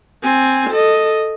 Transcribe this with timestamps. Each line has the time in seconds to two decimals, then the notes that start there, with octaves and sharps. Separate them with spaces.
0.23 C4 G#5
0.70 A4 D#5